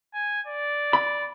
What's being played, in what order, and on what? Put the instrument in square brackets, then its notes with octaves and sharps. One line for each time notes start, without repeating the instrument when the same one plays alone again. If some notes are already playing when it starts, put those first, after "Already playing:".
[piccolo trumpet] G#5
D5
[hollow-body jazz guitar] B5